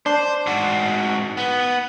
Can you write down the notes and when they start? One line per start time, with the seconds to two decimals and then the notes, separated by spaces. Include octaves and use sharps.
0.06 D4 C5
0.47 G#2 F#4
1.37 B3